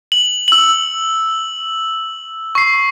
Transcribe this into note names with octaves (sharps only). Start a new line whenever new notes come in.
F#7
E6 F#7
C#6 C7